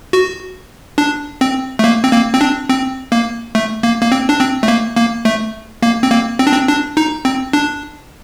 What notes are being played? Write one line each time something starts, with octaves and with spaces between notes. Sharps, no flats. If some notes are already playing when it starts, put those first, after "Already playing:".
F#4
D4
C4
A3
A#3
C4
A#3
C4
D4
C4
A#3
A3
A#3
A#3
C4
D4
C4
A3
A#3
A#3
A3
A#3
C4
A#3
C4
D4
C4
D4
D#4
C4
D4